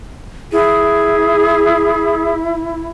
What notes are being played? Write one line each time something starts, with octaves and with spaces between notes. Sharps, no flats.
E4 G#4